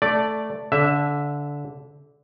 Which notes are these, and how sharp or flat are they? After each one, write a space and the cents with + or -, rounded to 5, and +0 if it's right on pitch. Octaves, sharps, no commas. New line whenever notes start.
A3 +0 D5 +0
D3 -20 E5 +5